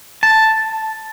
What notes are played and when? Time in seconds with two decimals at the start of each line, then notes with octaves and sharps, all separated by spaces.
0.23 A5